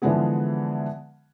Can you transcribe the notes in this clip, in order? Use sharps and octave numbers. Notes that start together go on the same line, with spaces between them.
D3 E3 F3 G#3 B3 G#4